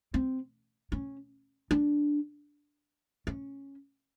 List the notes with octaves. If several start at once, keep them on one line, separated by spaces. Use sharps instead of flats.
C4
C#4
D4
C#4